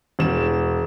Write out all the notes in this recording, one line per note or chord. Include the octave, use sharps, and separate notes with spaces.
E1 E7